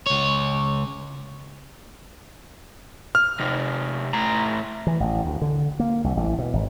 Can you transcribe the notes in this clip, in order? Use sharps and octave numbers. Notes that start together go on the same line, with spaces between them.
C#2 C#5
F6
C3 D#4
A2 A#5
E3
A1
D2
D3
A#3
C2
A1
B2
G#1